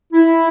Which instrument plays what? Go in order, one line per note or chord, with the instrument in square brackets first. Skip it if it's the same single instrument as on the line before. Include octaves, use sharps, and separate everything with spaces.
[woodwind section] E4